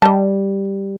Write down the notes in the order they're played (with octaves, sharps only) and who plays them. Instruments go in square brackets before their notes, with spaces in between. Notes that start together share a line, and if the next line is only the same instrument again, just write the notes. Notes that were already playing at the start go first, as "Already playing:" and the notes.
[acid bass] G3 [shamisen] D#5 A5